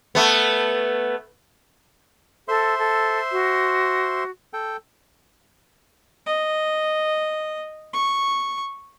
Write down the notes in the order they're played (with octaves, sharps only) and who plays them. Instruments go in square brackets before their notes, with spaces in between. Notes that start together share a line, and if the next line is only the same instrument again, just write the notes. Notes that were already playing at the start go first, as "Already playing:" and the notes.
[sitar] A3 B3
[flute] A4 [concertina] C5 E5 C6
[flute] A4
F#4
[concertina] A4 G5
[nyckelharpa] D#5
C#6